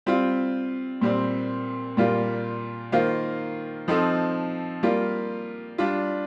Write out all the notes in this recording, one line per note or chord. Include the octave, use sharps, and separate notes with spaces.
G3 C4 F4
A#2 G3 C4
A#2 G3 A#3 F4
D#3 A#3 F4 C5 F5
F3 C4 D#4 A4
G3 A#3 F4
G3 D4 F4